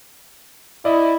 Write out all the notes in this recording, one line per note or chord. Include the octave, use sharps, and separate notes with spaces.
E4 D5 D#5